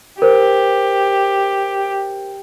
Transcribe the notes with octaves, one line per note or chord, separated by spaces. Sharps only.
G4 A#4 C5